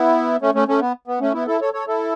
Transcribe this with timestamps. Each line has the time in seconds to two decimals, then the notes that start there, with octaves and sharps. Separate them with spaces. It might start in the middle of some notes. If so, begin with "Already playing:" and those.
Already playing: B3 E4
0.41 A3 C#4
0.54 A3 C#4
0.68 A3 C#4
0.81 B3
1.07 B3
1.21 A3 C#4
1.34 B3 E4
1.47 E4 A4
1.61 A4 C#5
1.73 A4 C#5
1.87 E4 A4